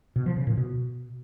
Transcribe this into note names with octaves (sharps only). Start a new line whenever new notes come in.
B2
F3
C#3
A#2
B2